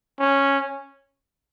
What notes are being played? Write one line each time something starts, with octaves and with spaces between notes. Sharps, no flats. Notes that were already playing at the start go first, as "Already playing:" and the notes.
C#4